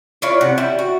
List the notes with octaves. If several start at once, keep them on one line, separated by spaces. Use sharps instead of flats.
E4 F4 C#5 D5
C3 F#5
G3 E4
F#4